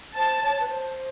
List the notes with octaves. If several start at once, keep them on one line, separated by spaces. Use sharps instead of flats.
C5 A5
C#5
B4
C5